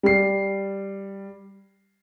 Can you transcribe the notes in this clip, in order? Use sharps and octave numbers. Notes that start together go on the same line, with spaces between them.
G3 C7